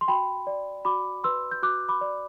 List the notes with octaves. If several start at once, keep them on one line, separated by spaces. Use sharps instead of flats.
C6
F#4 G5 B5
D5
F#4 B5 D6
B4 C6 E6
G6
F#4 D6 F#6
B5 D6
D5